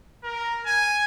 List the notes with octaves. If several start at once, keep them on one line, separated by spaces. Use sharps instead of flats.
A#4
G#5